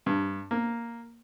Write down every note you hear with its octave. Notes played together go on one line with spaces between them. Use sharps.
G2
A#3